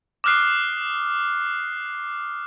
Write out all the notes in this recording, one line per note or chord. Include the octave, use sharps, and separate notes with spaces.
D6 D#6 F6 F#6 C7